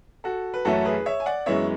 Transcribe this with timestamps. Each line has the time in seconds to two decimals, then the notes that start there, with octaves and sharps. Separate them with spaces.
0.24 F#4 A4
0.54 B4
0.65 F#2 E3 A3 C#4 E4 F#4 A4
0.85 G#4 B4
1.06 C#5 E5
1.20 G#5
1.26 D5 F#5
1.46 F#2 E3 G#3 B3 C#5 E5